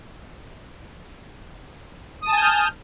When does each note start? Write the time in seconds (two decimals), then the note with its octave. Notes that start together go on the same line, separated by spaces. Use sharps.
2.22 D#6
2.27 A5
2.32 G#5
2.37 G6
2.42 F6